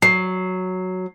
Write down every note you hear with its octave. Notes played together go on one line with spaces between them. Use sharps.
F#3 C7